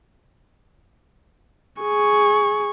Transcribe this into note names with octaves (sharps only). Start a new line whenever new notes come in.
G#4 C#6